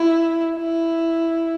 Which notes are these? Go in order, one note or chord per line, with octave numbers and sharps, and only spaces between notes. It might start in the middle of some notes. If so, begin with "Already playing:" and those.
Already playing: E4
E4